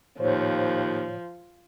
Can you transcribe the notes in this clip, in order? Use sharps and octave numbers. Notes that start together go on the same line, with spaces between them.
D#2 A2 F3 C5 C#5